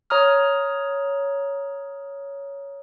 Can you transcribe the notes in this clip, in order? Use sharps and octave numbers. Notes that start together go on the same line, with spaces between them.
C#5 A#5 D#6 F6